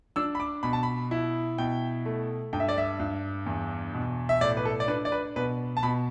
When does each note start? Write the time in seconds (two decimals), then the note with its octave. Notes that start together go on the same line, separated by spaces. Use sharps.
0.16 D4 E6
0.35 B5
0.40 D6
0.63 B2 B5
0.73 A5
0.83 B5
1.11 E4
1.58 B2 G5
2.06 A3
2.53 G2 G5
2.60 E5
2.69 D5
2.78 E5
3.00 G2
3.46 E2
3.93 B2
4.29 E5
4.41 A2 D5
4.57 B4
4.65 A4
4.80 D5
4.88 D4 B4
5.05 D5
5.12 B4
5.36 B2 B4
5.77 A5
5.83 B2 B5